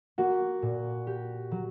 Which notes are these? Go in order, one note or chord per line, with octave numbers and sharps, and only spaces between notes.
A#3 F#4
A#2
G4
F#3